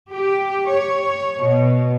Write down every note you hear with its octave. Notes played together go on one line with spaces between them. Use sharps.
G4
C#5
B2